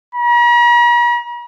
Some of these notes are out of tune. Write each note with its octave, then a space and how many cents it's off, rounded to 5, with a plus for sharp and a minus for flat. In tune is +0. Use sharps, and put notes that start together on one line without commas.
A#5 +45